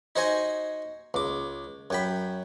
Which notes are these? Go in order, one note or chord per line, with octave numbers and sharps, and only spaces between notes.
D#4 F#4 C5 F#5 G#5
C#2 D6
F#2 G5 B5